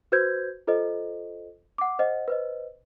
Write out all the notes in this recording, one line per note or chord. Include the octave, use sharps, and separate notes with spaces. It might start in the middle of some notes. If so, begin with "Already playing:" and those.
F#4 B4 C5 G6 G#6
F4 A4 C5 D#5
F#5 D6
C5 D#5 F#5
B4 C5 D#5